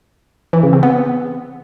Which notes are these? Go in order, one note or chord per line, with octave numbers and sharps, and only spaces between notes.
E3
C#3
C4
B3